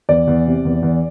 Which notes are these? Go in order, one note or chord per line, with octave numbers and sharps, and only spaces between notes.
E2 D5
E2
C3
E2
E2